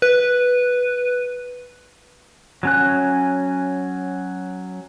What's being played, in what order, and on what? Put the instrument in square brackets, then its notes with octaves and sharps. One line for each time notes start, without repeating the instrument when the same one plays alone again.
[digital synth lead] B4
[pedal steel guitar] F#3 C#4 F#6